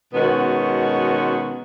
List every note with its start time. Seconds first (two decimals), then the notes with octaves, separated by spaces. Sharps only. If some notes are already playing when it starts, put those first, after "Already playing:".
0.14 B2 D#3 G#3 B3 C#4 F#4